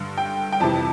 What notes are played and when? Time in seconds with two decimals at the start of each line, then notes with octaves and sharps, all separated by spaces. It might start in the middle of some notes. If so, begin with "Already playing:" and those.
Already playing: G2 D3
0.18 G5
0.52 G5
0.60 F2 C3 E3 A5